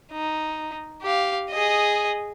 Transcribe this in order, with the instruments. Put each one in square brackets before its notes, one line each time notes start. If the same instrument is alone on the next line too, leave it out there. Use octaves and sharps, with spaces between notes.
[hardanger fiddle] D#4
G4 F5
G#4 D#5